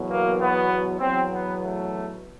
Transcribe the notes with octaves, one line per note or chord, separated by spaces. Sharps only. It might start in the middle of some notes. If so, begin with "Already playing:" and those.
Already playing: E2 B2 F#3
A#3
B3
E2 B2 F#3 C4
B3
A3